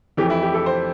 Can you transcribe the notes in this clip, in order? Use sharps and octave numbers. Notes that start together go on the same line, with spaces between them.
F2 E3 A3 G4
E4
G4
A4
C5